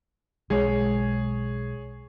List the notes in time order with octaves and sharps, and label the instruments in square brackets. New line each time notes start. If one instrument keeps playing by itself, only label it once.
[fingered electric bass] B1 G#3 [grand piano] G#4 C#5